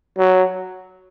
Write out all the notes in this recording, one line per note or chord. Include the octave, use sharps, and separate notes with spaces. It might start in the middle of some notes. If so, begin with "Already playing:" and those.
F#3